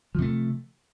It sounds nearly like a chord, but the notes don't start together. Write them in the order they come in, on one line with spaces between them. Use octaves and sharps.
F3 C3 A3